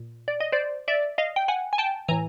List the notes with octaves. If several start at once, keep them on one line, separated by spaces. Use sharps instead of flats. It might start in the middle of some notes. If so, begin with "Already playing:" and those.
Already playing: A#2
D5
D#5
C5 D5
D5 E5
D#5 F5
G5
F#5 G#5
G#5
G5 A5
A2 E3 G#5 A#5